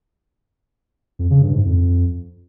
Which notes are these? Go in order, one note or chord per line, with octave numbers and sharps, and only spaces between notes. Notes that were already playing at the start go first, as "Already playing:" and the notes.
F2
C#3
G2
G#2
F2